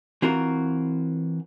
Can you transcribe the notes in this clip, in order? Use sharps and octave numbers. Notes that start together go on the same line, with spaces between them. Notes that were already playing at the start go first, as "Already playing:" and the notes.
E3 C4 F4 F#4 A#4